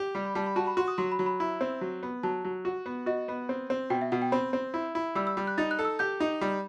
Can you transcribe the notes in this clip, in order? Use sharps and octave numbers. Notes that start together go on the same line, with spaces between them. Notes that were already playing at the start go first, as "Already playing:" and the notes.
Already playing: G4
G3
B5
G3 A5
B5
F#4 A5
B5
F#4 C6
D#6
F#3 C6
B5
F#3
B5
E4
C4
F#3
B3
F#3 A5
F#3
F#4
B3
F#4 D#5
B3
C4
C4
B2 G5
E5
B2 F#5
G5
C4 B5
C4
E4
E4
G3 E6
E6
G3
F#6
D#4 A6
F#6
A4
E6
G4 G6
D#4
G3